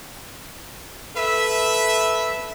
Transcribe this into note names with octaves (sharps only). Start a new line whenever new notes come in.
A4 B4 E5